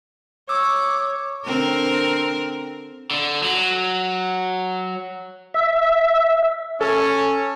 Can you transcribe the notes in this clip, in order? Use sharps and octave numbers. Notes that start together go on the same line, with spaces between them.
C#5 D6 E6
D3 C4 A#4
D3
F#3
E5
C#4 A4